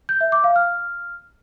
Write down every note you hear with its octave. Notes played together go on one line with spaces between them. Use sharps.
G6
E5
D6
F5
F6